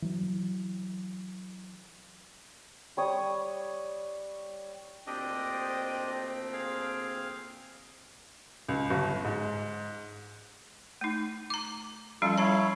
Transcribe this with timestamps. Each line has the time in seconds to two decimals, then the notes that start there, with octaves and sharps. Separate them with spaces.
0.02 E3 F#3
2.97 G3 C#5 D#6
5.07 D2 A#2 C4 D4 G4 D#5
6.53 G#4 F5
8.68 C#2
8.90 G1
9.24 G#2
11.01 A3 D#4
11.50 A#5 D6
12.22 F3 G3 C#4 F4 A4
12.38 E4 C#5 F5 A5 A#5